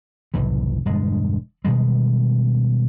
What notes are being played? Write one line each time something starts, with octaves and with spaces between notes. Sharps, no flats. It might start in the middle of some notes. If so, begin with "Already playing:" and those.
F#1 C2 A2 E3
E1 G2 D3 G#3
B2 D#3 G3 G#3